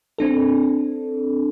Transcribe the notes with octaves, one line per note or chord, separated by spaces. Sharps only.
C4 D4 A4